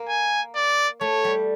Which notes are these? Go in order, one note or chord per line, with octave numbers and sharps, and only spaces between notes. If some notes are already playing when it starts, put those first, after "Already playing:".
Already playing: A#3
G#5
D5
A3 C#5
G3